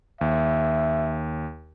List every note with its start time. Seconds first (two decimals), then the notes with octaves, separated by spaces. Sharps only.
0.21 D#2 E5